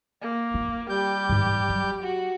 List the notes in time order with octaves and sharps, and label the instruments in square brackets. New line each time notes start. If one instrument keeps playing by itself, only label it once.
[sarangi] A#3
[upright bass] F4
[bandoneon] G3 G6 [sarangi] G4
[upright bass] G#2 E3
F#3
[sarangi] F#4